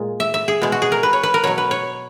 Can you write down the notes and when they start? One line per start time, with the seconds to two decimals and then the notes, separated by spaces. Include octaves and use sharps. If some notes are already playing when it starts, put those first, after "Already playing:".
Already playing: A#2 G#3
0.20 E5
0.34 E5
0.48 G#4
0.62 B2 G#3
0.72 F#4
0.82 G#4
0.92 A#4
1.03 B4
1.13 C#5
1.23 B4
1.34 A#4
1.44 B2 F#3 C#5
1.58 B4
1.71 C#5